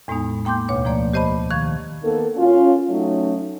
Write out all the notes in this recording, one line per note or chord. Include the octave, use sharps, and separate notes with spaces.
E2 A2 G#3 B3 D#4
A#3 G5 C6 D6 G6
D2 B2 C#5 D6
F3 A3 A#3 D5
G4 C5 D#5 A5 B5
D#3 F5 C#6 G#6
D#3 A#3 B3 A4
C#4 F4
F#3 A3 C#4 D#4